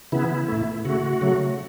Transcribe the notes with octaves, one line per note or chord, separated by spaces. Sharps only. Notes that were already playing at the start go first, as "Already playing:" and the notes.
C#3 E3 B3 E4
A2 A3
C#3 A3 F#4
C#3 F#3 A3